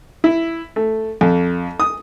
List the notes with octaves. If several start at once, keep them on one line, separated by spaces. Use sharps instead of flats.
E4
A3
F2
D#6